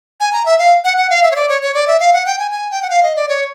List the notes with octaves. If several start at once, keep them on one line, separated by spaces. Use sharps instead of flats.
G#5
A#5
E5
F5
F#5
F#5
F5
E5
C#5
D5
C#5
C#5
D5
E5
F5
F#5
G5
G#5
G#5
G5
F#5
F5
D#5
D5
C#5